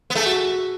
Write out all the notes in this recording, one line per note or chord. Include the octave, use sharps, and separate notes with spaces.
B3
A3 G#4
F#4